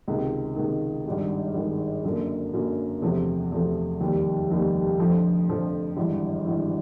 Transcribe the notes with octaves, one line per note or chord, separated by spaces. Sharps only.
C#2 C3 D#3
C#2 C3 D#3
G#1 G2 D#3 G#3
G#1 G2 D#3 G#3
F#2 D3 F#3 A#3
F#2 D3 F#3 A#3
E2 C3 F3 A3
E2 C3 F3 A3
F1 D#2 D#3 G3
F1 D#2 D#3 G3
F2 D3 F3 A3
F2 D3 F3 A3
G#1 G2 E3
G#1 G2 E3